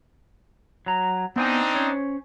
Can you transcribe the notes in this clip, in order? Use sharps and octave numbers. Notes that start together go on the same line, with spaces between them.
F#3 A#5
B3 C4 D4 D#4 G#5
C#4 C5 C#5